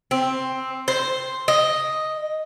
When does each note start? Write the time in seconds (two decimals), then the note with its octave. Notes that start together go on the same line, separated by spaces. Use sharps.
0.11 C4
0.88 C5
1.48 D#5